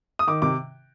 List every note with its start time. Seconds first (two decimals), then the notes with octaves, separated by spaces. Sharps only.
0.19 D#6
0.27 D#3 D6
0.42 C3 D6